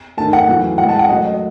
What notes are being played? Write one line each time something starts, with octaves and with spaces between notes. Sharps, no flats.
G#2 D#3 A3 A5
F#5
E2 C#3 F#3 A3
A2 G#3 F#5
A5
F#5
F#2 C#3 F#3 A3 D#5
D#5